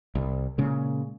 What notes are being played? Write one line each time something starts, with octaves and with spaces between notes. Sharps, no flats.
C2
A#2 C#3 G#3